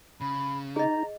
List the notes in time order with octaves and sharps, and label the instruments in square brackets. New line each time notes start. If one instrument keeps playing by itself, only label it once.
[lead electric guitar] C#3 [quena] B5
[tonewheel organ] D#4 [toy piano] G#4 D#5 [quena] A#5